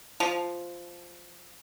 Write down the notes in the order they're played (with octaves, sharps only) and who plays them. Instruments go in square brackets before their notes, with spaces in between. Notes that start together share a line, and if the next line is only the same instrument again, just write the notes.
[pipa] F3